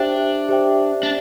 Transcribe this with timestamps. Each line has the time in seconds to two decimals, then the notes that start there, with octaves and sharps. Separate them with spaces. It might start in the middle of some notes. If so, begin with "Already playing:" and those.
Already playing: D4 G4 C5 E5 G5
0.49 G4 C5 E5 G5
1.03 D4